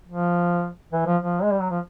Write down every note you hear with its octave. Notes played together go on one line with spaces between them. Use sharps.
F3
E3
F3
F3
G#3
G3
F#3
F3